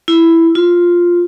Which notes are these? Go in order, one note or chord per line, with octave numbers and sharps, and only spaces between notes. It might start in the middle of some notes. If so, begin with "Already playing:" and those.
E4
F4